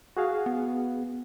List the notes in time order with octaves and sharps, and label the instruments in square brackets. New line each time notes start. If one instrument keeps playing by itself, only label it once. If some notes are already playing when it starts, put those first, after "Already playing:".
[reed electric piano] F#4 G#4 F5
[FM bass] B3